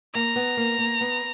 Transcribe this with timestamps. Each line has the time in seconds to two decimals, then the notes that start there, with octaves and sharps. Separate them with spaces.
0.14 A#3 A#5
0.36 B3
0.57 A#3
0.79 A#3
1.01 B3